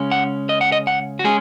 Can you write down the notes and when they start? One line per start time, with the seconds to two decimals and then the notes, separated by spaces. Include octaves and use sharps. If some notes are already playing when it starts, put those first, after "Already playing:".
Already playing: C#3 G#3 C#4
0.12 F#5
0.49 D#5
0.61 F#5
0.72 D#5
0.87 F#5
1.19 F#4
1.24 G#3 C#4 G#4